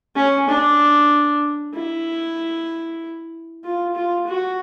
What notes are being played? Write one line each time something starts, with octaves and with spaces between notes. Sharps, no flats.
C#4
D4
E4
F4
F4
F#4